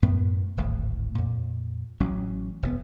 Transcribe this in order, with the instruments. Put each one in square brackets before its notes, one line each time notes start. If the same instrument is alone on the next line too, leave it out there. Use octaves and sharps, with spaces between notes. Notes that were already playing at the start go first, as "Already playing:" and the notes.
[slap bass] F#2 A2 B3
D1 G#1 A2
F2 A#2
A1 F#3 C#4
E1 C#3 B3